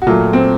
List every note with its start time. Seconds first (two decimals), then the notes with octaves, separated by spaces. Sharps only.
0.02 F#4
0.07 A#2 F#3 A3 F4
0.33 C4